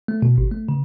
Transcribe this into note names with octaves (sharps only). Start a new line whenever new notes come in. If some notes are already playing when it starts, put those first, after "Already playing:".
A3
B2
G#1
A3
C#3